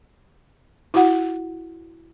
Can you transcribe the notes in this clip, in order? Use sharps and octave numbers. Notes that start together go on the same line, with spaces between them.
E4 F#4 F#5